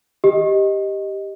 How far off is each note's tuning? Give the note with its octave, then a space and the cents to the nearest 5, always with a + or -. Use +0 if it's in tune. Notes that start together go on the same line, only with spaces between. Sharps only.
G4 +0 D#5 +0